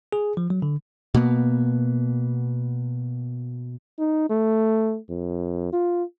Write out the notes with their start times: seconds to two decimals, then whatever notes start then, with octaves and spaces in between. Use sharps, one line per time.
0.13 G#4
0.37 F3
0.50 F#3
0.62 D3
1.14 B2 A#3 B3
3.99 D#4
4.30 A3
5.09 F2
5.73 F4